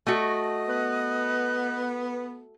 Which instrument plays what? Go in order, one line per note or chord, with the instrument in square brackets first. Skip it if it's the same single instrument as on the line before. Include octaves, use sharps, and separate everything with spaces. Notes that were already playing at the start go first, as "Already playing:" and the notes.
[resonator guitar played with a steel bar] A3 F#4 [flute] D#5
[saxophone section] B3 [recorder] F#6